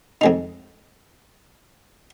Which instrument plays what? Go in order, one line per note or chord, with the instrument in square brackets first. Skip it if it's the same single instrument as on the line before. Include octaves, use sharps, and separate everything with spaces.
[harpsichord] F2 G#3 D#4